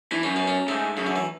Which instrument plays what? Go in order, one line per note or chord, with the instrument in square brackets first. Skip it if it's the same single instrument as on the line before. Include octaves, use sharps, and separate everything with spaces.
[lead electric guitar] E3 [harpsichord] D4
[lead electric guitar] F#2 [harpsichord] C#4
[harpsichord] B3
C#4
[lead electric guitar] G#2 [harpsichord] A3
[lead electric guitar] F#2 [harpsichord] C#3
[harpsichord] D3
E3